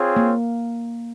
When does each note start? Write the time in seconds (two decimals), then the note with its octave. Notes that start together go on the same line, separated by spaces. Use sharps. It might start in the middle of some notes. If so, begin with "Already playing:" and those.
Already playing: C4 F4 G#4 C#5
0.16 A#3